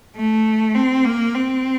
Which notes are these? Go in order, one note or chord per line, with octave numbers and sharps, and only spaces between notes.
A3
C4
A#3
C4